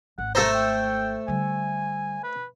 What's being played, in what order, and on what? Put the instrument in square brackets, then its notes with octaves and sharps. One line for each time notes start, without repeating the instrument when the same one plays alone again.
[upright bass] G#1 [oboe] F#5
[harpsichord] A3 A4 C5 [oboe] A#5
[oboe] G5
[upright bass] D3 G3 [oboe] G#5
[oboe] B4